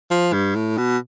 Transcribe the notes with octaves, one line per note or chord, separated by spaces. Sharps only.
F3
G2
A2
B2